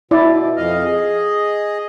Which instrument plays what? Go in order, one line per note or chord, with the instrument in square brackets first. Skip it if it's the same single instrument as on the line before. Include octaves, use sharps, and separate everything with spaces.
[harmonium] B2 [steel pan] E4 D5
[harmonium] F2 D#5 F5
G#4 D#5